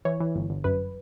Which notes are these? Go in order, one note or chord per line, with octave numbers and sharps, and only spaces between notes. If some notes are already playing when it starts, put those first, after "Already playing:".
E3 C#5
E3
G1
G1
F#2 B4